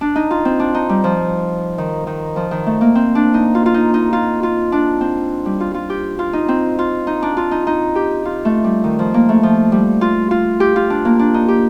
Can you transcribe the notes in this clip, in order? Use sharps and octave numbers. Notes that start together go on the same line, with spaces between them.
D4
D#4
F4
C4
D4
D#4
G3
F3
D#3
D#3
F3
D#3
A3
A#3
C4
D4
D#4
F4
F4
D#4
D#4
F4
F4
D4
C4
G3
F4
F4
G4
F4
D#4
C4
F4
D#4
D4
F4
D#4
D#4
G4
F4
A3
G3
D#3
F3
A#3
A3
F3
G3
F4
F4
G4
F4
D4
A#3
D4
D#4
G4